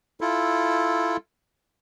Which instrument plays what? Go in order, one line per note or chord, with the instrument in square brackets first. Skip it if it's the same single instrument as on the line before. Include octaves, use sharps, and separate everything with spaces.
[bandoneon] E4 F4 A4